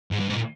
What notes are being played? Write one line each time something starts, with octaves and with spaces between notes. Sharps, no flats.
G#2
G2
G#2
A#2